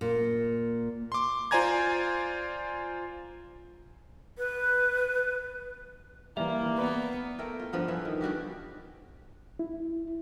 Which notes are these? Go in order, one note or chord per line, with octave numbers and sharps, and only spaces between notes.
A#2
C6 D6
F4 C5 D5 G#5 A#5 G#6
B4
E3 G3 A#3 E5
B3 B4 D5 A#5
A3 E4 A#4 G5
F4
G2 F3 B3 A#4
E3 C#4 A4
D#3
D3 G3 F#4 G4
E4